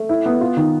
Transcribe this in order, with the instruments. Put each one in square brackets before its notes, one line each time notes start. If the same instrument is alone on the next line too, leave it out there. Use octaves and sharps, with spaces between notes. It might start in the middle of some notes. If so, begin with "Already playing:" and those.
Already playing: [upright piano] A3
E4
B3
F4
D#3